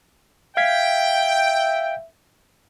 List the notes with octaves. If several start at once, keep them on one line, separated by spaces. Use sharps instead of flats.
E5 F5 G5 G#6 B6